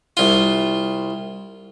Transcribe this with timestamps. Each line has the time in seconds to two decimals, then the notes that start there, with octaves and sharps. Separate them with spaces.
0.17 C2 F4